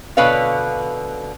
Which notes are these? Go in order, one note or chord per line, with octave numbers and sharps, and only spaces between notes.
B2 D3 B4 C#5 F5